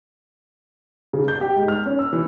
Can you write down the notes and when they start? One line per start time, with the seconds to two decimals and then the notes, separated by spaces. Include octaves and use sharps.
1.13 C#3
1.28 G6
1.41 G4
1.56 G#2
1.68 F6
1.86 C#4
1.99 E6
2.13 E3